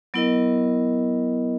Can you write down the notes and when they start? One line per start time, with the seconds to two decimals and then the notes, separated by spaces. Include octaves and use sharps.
0.14 F#3 B3 E4 A#4 D#5